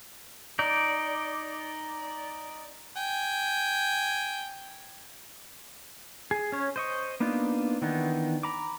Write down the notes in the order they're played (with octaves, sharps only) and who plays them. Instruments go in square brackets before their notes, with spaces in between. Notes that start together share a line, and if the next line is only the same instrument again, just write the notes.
[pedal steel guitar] D#4 D5
[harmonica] G5 G#5
[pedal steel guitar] G#4
C#4 C#5
C5 D#5 C#6
A#3 B3 D4 D#4 F4
D#3 E3 B3 D4 D#4
A#5 B5 D6